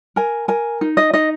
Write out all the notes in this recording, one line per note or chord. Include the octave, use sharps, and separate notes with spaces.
A#4 G#5
A#4 G#5
D#4
D#5
D#4 D#5